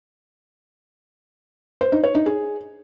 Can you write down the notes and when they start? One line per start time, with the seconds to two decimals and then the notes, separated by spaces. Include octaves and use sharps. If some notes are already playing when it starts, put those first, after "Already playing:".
1.81 C5
1.92 D#4
2.04 C#5
2.15 D#4
2.26 G#4